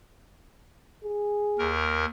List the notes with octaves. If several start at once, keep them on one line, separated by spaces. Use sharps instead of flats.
G#4
D#2 A#4